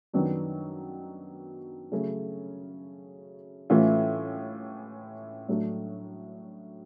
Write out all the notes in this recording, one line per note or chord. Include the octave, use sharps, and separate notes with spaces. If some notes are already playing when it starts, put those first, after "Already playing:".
F#2 D#3 F#3 B3 D4
C#3 F#3 A3 C#4
A2 E3 A3 C#4 F4
A2 F#3 A3 D4